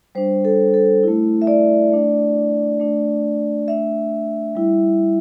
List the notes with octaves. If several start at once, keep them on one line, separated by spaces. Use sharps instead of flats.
G3 D4 C5
A4
A4
A3 E4
E5
D5
A3 D4
A3 D4
A3 D4 E5
G3 E4